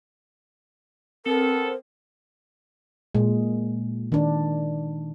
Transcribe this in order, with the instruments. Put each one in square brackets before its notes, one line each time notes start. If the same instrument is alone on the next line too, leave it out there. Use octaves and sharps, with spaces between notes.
[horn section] B3 A4 [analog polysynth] C4 [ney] A#4
[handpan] A#2 G#3
D#3 D4